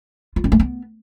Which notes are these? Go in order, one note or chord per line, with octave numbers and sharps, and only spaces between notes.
F4
C4
A3
B3